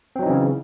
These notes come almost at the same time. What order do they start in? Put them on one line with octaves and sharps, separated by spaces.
C4 F#3 D#4 E3 C#3